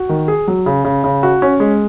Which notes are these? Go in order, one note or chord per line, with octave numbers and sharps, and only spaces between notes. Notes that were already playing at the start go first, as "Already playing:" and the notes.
Already playing: F#4
D#3
G#4
F#3
C#3
C#3
C#3
F#4
C#4
G#3